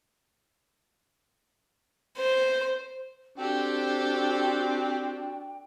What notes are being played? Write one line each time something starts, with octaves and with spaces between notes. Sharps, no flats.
C5
C4 D4 F#4 G4 A4 G5